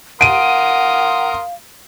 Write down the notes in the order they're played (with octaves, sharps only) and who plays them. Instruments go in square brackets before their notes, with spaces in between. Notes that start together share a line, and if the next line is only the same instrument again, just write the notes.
[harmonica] A#4 C6 D#6 [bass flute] F5 [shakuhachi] F#5 [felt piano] D7 D#7